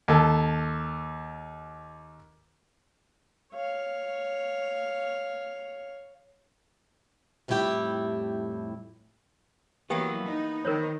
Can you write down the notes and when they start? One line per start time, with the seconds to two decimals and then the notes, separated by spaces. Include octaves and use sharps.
0.08 D#2 A4
3.53 C#5 F5
7.48 F2 A2 G3 E4 G4 G5
9.90 E3 F#3 A#3 B3 G4 G5
10.24 D#4
10.65 D#3 A#4 C5 C#5